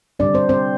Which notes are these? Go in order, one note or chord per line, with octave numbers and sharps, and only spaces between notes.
D3 G3 C4 D4 D5
C4 C5
C4 C5